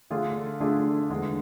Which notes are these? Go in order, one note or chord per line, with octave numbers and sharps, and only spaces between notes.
D3 A3 D4 F4 G#4
D3 A3 D4 F4 G#4
E2 D3 G#3